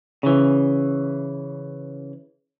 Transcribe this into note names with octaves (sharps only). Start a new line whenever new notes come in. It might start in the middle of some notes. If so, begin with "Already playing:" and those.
C#3 E3